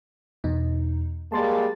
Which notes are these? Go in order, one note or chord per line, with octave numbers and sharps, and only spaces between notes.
E2 B2 D#4
G3 G#3 A#3 A5 C6 A6